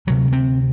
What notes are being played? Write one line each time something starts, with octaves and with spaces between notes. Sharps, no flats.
D2 C3 F#3
C4